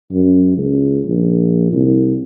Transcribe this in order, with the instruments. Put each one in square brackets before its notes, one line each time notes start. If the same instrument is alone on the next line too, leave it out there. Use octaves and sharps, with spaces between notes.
[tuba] F#2
C#2
A#1
C2